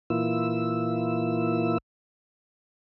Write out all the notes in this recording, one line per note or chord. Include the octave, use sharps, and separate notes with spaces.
A#2 E3 A#3 E4 F4 E6